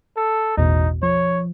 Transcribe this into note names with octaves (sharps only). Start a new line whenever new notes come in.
A4
A1 E2 B2 D#4
F3 C#5